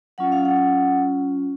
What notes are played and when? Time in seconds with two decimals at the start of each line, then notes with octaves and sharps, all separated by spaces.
0.18 F#3 C#4 F4 F#5
0.32 F5
0.45 F#5